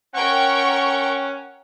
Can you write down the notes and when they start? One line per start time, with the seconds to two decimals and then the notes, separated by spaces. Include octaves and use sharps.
0.15 C#4 A#4 F#5 G5 C#6